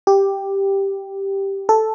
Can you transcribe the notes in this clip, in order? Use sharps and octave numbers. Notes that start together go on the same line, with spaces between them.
G4
A4